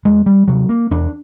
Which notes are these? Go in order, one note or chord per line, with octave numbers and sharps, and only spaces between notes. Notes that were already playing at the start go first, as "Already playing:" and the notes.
E2 G#3
G3
C3 F#3
A#3
E2 D4